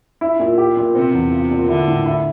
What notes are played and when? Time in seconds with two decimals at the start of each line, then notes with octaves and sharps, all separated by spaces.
0.21 E4
0.40 A#2
0.58 G4
0.77 A#2
0.95 C3 C4
1.13 E2
1.32 F4
1.51 A#2
1.68 D3 E4
1.88 A2
2.06 E4